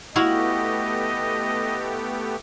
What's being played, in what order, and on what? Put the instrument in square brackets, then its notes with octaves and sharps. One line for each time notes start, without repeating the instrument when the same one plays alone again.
[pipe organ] A3 B3 G4 [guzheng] E4 F#4 F5 [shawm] D#5